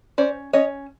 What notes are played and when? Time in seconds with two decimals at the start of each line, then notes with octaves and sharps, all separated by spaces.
0.18 C#4 C5 D5
0.53 C#4 C#5 D#5